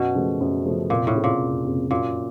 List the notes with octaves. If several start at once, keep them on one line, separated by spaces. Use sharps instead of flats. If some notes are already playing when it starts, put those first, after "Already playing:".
Already playing: F#2 B2
C#3 F3 A3
F#2
C#3 F3 A3
F1 A#2
A2
F2 C#3
A#2
F1
F2 C#3
F#2 A#2